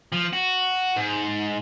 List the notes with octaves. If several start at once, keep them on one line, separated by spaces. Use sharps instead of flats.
F3
F#4
G#2